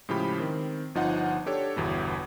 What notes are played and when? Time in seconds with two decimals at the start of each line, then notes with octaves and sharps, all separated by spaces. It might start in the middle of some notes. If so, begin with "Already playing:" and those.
0.09 A2 C#3 F3 G#3 G4 B5
0.40 D#3 C4
0.95 G1 F3 D#4 F4 F#5
1.46 D4 G4 A4 C#5
1.76 G1 E2 B2 B3